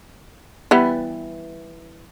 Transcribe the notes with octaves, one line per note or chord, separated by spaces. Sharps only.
E3 G3 B3